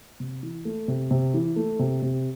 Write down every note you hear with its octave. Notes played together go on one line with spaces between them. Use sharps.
C3
E3
A3
C3
C3
E3
A3
C3
C3